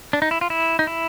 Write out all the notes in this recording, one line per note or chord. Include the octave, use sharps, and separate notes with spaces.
D4
D#4
E4
F4
E4
D#4
E4